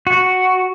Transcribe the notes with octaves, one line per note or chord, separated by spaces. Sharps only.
F#4